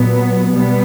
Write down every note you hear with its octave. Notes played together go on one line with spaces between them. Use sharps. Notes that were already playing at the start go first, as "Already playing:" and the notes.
Already playing: A#2 F#3 B3
B2 G3 B3